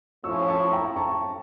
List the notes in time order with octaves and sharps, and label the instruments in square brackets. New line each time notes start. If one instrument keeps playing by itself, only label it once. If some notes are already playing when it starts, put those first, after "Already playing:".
[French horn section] A2 F3 C#4 E4 [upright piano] C#6 E6
[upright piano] A5 C#6
G5 A#5
A5 C#6